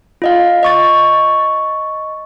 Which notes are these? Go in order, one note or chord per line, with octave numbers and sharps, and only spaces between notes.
F4 D#5 F5
D#5 C#6 A6